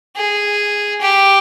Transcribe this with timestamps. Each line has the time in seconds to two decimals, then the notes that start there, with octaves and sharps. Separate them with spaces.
0.16 G#4
1.01 G4